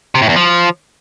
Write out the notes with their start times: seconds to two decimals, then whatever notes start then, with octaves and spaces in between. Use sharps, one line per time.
0.15 C3
0.22 A2
0.29 E2
0.36 F3